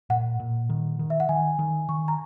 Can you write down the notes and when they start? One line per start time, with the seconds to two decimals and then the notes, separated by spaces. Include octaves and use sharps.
0.10 A#2 F#5
0.40 A#2
0.70 D#3
0.99 D#3
1.10 E5
1.20 F#5
1.29 D#3 G#5
1.59 D#3
1.89 D#3 C#6
2.08 A#5